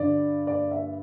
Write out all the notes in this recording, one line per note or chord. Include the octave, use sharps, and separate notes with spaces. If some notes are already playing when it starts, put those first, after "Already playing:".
Already playing: G2 D3 D5
D5
E5